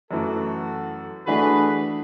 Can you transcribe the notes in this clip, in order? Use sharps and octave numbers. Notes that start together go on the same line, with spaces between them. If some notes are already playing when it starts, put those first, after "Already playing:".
F#2 E3 A3 F#4 A4
E3 A3 D4 F#4 G#4 B4